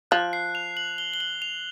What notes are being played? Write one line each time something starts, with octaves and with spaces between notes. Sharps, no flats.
F3 F#6
C7
F7
F#7
G7
G7
F#7
F7